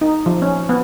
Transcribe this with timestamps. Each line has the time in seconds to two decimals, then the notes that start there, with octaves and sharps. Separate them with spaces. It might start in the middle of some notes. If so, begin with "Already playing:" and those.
0.01 D#4
0.26 F3
0.42 C#4
0.69 B3